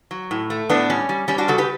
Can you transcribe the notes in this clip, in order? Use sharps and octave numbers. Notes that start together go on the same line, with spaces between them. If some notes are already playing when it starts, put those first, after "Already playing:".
F#3
A2
A3
A2 B3 D4
G3 C#4
G3
G3 C#4
D4 F#4
C#3 F#4 A4
G4 B4